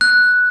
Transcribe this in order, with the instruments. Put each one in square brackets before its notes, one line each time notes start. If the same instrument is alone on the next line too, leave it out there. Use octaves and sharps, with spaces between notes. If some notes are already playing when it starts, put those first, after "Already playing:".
[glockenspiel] F#6